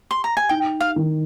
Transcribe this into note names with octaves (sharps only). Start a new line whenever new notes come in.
C6
A#5
G#5
D#4 G5
F5
D#3